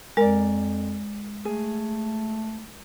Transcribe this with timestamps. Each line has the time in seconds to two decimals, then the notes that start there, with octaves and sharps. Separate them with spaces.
0.17 F2 G#3 A#4 D5
1.45 A3 G#4